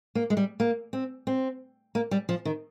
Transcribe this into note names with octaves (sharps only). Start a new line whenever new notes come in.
A#3
G#3
G3
A#3
C4
C4
A#3
G3
F3
D#3